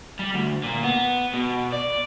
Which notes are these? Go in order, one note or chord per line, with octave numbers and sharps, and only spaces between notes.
G3
D2
A#2
B3
B2
D5